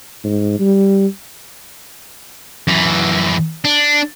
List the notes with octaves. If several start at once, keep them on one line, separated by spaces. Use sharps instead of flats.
G#2
G3
F#2 E3
D4